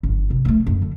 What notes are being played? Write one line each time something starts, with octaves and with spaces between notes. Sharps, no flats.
G1
C3
A3 A#3
F#2
D3